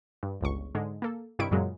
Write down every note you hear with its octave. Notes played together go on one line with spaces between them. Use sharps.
G2
G1 C#2 C#6
G#2 D3 G#3
A#3 A4
G2 C3 D#3 E4 C#6 D7
F#2 A#2 C#3 F#3 G#3